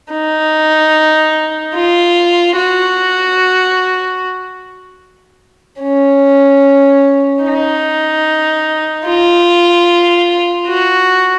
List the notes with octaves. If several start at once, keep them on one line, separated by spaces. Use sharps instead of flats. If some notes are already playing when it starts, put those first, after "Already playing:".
D#4
F4
F#4
C#4
D#4
F4
F#4